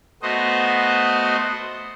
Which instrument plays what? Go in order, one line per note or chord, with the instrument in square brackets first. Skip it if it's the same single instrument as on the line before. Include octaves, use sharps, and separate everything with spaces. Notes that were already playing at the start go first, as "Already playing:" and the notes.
[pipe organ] A3 B3 F#4 C5 D#5